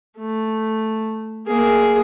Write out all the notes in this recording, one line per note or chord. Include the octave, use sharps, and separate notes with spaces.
A3
A#3 G#4